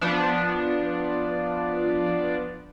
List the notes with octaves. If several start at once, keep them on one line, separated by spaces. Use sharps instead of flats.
F3 B3 D4